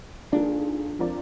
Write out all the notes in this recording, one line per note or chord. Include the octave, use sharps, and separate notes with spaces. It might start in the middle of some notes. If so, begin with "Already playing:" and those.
F2 D#3 A#3 D4 F4 G#4
F3 C4 F4 A#4 D5